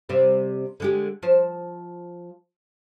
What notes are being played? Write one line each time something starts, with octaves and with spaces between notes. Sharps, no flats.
C3 G3 C4
D3 G#3 G4
F3 C5